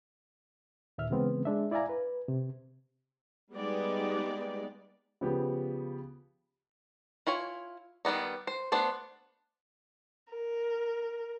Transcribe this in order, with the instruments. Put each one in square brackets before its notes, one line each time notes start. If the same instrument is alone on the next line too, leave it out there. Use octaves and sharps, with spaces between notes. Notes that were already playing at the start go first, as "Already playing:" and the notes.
[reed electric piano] D#2 A#2 E5 F6
C#3 E3 G#3 B3 C4
G#3 D4 E5
E4 D5 E5 F5 G#5 A#5
B4
C3
[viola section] G3 G#3 B3 D#4 D5
[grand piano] C#3 F3 B3 G4
[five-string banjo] E4 F4 C#5 G#5
D#3 G3 B3 D#4
C5
A3 B3 D4 C5
[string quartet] A#4